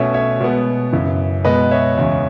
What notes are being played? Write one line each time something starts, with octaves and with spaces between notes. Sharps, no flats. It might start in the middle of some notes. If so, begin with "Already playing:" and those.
Already playing: B2 A3 C#4 C#5 E5
C#5 E5
B2 G#3 B3
F#2 C#3 E3
B2 G#3 B3 B4 D#5
C#5 E5
E2 C#3 G#3 C#4